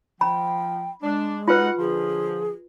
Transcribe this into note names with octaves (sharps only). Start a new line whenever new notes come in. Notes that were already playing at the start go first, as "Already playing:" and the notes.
F3 G5 B5
G#3 D4
D#4 F4 F#4 B4 F#5
D3 F3 G#4